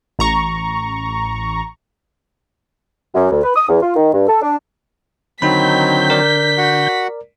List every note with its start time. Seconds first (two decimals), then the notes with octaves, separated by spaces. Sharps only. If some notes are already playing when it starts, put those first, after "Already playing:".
0.19 A1 A#5 C#6
3.15 F#2
3.31 D2
3.43 B4
3.56 D#6
3.69 E2
3.82 F4
3.96 D#3
4.13 G2
4.28 A4
4.41 D4
5.42 D3 D#3 F#3 C4 D#4 B5 G6 B6
6.10 A#4 D5
6.58 F#4 F#5